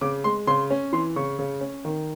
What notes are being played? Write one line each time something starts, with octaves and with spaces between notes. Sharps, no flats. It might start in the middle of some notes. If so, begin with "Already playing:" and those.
C#3 D6
G#3 C6
C#3 C6
C#4
E3 C6
C#3 C#6
C#3
C#4
D#3